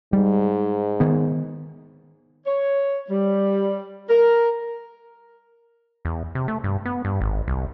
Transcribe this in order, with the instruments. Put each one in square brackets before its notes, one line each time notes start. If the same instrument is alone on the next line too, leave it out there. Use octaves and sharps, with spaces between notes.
[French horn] G#2 [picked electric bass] G3
[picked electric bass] D#3 B3
[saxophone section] C#5
G3
A#4
[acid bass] E2
C3
A3
G2
B3
G2
G#1
C2